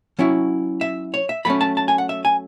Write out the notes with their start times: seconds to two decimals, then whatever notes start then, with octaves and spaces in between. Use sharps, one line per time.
0.19 F#3 C#4 E4
0.81 E5
1.14 C#5
1.29 E5
1.45 F#3 A3 C#4 B5
1.61 A5
1.77 A5
1.88 G#5
1.98 F#5
2.09 E5
2.25 G#5